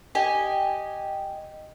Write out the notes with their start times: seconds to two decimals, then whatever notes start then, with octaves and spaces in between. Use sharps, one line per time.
0.15 G4 D#5 G#5